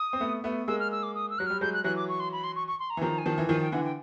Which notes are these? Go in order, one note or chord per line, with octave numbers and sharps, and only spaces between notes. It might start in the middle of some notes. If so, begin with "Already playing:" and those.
Already playing: D#6
C4
A3 B3
A3 B3
G#3 A#3 E6
F6
E6
D6
D#6
E6
F#3 F#6
G3 F6
F#3 G#3 G6
F#6
E3 F#3 F#6
D6
C#6
C6
B5
C6
C#6
C#6
C6
A#5
E3
D#3 F3 A#5
G#5
D#3 F3 A5
E3
D#3 F3 G#5
G5
D3 E3 F#5
G5